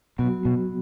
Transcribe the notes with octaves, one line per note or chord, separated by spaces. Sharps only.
B2 F#3 B3 F#4
B2